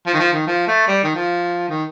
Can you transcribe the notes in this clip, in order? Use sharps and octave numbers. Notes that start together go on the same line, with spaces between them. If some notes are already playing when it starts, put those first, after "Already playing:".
F3
D#3
F3
D#3
F3
A3
G3
D#3
F3
D#3